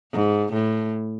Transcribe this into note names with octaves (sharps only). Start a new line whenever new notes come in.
G#2
A2